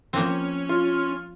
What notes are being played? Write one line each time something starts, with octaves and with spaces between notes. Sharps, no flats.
F3 A#3 C4 C#4
F4